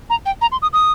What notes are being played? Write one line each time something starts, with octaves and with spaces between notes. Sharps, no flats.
A#5
G5
A#5
C6
D#6
D#6